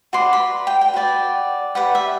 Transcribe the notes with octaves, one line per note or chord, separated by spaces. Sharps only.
F#4 B4 D5 C6
B5
G5
G5
F#4 B4 D5
G4 B4 D5 F#5
E5